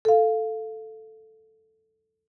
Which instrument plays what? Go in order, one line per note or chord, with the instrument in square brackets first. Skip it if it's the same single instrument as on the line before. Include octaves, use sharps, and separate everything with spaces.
[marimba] A4 F5